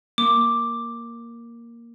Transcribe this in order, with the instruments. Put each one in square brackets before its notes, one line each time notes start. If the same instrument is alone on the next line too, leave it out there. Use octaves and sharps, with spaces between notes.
[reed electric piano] A#3 [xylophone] D6